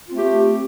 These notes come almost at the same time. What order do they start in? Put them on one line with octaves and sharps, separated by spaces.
F4 C4 A3 G4